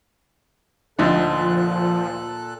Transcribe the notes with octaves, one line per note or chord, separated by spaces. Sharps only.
D2 A#2 F3 D4 D#4 A4 F#6